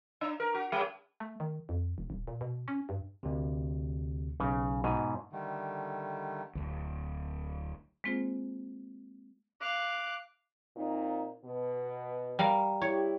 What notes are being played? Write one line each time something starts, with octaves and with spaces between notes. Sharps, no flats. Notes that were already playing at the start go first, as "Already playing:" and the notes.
D4
A#4
F#4
G3
A3
D#3
F2
E1
D#1
A#2
B2
C#4
G2
D2 C3
B1 C#3
G#2 B2 G#5
D3 D#3 G3 A3
D1 G1 D2
G#3 A#3 C4 F4 G#4 C5
F5 D6 F#6
A#2 C4 D#4
B2
G3 A#4 F5
E4 G4 C#5